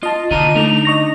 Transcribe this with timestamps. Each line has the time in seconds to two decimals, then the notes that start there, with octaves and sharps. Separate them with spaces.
0.03 F4 D#5 A5
0.31 D#2 D3 F4 A#5 D#7
0.55 A3 D4 D#4 F7
0.85 D#5 C#6 A#6